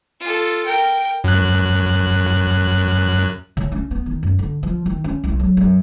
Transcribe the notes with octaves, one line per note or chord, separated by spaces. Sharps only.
F4 A4
A#4 G5
F#2 F#6
C#3
C#4
B3
D#3
F#2
D3
F3
D#3
C#4
C2
F#3
F#2